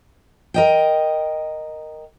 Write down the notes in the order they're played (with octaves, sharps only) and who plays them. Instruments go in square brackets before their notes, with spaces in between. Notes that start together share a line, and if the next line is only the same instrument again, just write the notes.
[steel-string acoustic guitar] A#4 D#5 G5